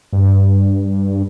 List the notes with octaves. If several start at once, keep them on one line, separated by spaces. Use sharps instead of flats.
G2